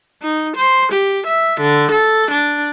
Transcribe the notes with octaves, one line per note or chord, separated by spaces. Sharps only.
D#4
C5
G4
E5
D3
A4
D4